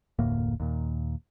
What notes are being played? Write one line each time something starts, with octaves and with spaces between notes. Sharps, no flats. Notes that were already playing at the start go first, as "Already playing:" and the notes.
F1 D2 A2 A#3
D#2 A#2